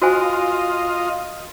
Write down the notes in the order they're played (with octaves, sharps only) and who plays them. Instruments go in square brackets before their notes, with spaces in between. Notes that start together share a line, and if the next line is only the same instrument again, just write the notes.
[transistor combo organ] F4 D#5 [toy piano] F#4 C5 G#5